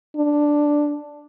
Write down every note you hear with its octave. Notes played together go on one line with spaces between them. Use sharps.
D4